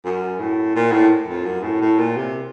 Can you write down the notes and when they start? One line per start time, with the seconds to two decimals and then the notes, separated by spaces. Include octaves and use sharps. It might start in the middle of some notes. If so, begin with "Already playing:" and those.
0.05 F#2
0.39 A2
0.75 A#2
0.92 A2
1.28 F2
1.45 F#2
1.63 A2
1.81 A2
1.99 A#2
2.16 C3